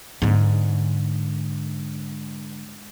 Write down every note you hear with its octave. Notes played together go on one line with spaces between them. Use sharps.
G#2 D3